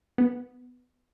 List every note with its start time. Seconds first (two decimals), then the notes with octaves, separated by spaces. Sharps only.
0.18 B3